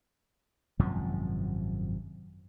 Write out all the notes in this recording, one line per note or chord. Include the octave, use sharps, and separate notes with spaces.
G#1 F#2 C3 F3